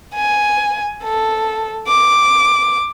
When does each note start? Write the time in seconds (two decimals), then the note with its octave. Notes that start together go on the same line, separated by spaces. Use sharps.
0.15 G#5
1.03 A4
1.88 D6